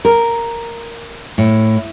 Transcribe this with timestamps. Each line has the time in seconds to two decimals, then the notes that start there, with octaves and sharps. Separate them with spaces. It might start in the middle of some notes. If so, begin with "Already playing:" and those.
0.05 A#4
1.38 A2